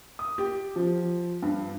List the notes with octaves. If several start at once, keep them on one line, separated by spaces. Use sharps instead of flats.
D#6
G4
F3
G2